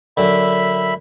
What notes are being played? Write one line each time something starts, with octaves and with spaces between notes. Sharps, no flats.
F#2 D3 E5 B5